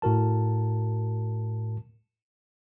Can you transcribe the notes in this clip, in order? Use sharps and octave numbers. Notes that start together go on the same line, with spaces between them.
A2 F#4 A#4 A5